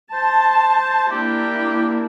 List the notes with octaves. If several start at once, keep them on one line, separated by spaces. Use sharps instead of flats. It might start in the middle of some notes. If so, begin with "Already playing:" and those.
C5 A5
A#3 D4 E4 G4